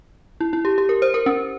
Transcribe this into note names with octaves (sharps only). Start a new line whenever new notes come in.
E4
E4
G4
G4
A#4
C5
A#4
C#4